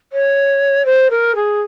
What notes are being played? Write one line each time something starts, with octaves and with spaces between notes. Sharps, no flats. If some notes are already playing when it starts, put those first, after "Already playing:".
C#5
C5
A#4
G#4